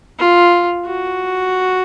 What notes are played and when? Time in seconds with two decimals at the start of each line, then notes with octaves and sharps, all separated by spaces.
0.18 F4
0.85 F#4